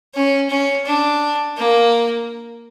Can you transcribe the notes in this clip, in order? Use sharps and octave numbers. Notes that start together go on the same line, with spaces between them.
C#4
C#4
D4
A#3